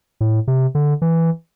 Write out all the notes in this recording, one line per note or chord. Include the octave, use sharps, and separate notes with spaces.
A2
C3
D3
E3